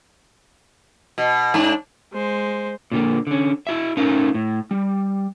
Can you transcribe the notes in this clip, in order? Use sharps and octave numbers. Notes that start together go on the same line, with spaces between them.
B2
G#2 D4
G#3 C5
A#2 D3 A#3
D3 C#4
E4 F#4 E5
A3 C#4 D#4 A#4 F5
A2
G3